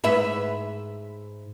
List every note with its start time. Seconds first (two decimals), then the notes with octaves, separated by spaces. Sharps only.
0.04 G#2 B4 E5